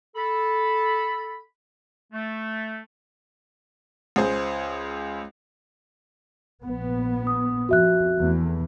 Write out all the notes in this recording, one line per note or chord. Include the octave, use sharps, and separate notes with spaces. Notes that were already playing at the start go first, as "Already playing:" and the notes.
A4 B5
A3
C#2 G#4 C5
A#1 B3
D#6
F2 F#4 E5 F#6
E2 E3 A3